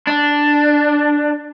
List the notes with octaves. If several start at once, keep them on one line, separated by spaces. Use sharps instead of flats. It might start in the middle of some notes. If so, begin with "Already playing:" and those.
D4